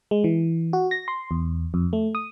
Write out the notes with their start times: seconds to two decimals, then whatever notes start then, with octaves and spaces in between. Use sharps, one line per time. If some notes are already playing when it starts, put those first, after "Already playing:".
0.11 G#3
0.24 E3
0.73 F#4
0.91 A#6
1.08 C6
1.31 E2
1.74 F2
1.93 A3
2.15 D#6